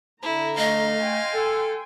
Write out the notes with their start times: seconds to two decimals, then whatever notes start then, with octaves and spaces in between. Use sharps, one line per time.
0.23 D3 E4 A#5
0.58 A3 D#5 F5
1.01 G5 G#5 C6
1.34 A4